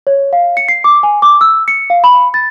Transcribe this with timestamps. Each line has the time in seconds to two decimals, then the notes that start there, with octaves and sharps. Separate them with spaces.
0.07 C#5
0.33 F5
0.57 C#7
0.68 C7
0.84 D6
1.03 G#5
1.22 D6
1.41 E6
1.68 C#7
1.90 F5
2.04 B5
2.34 A6